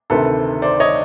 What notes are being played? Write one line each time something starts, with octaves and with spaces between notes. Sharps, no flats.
D2 C3 D#3 A4 B4
C5 D5
C#5 D#5